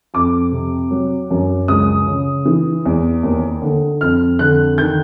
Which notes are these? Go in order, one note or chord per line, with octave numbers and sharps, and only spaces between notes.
F2 D6
C3
F#3
F#2
C#2 D#6
C#3
E3
E2
D#2
D3
F2 F6
D3 F#6
D#3 G6